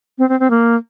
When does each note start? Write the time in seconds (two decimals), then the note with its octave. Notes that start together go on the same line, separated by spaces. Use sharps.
0.18 C4
0.29 C4
0.40 C4
0.50 A#3